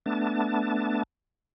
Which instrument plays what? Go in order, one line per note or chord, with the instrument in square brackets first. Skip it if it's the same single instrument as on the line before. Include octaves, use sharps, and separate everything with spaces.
[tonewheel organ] A3 B3 D4 A5